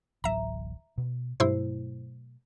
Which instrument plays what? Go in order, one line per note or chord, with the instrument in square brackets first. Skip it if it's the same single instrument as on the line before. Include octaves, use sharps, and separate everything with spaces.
[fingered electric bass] D1 A1 F#3 [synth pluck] E5 A#5
[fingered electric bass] B2
[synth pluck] G2 E4 C5 [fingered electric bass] B2 F#3 A3